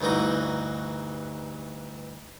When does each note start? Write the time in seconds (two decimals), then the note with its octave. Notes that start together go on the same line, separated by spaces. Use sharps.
0.01 D2 G2 E3 D#4 F#4